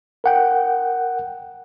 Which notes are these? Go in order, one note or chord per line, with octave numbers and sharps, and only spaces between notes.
A#4 F#5 G5